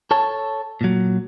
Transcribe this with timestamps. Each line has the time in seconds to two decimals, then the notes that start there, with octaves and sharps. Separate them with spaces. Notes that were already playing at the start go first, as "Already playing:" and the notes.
0.11 A4 C#5 A5
0.81 A#2 F#3